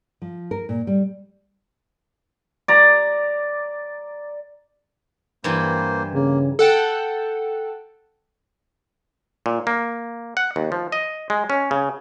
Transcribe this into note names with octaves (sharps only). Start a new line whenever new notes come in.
F3
A#4
A#2
G3
D5 A#5
G2 E3 G3 A#3 C5
C#3 A#3
A4 F#5 G5
A#2
A#3
F#5
D#2
F3
D#5
G#3
C#4
C#3